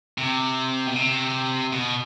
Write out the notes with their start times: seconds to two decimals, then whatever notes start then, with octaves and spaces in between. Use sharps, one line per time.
0.18 C3
0.87 B2
0.96 C3
1.73 B2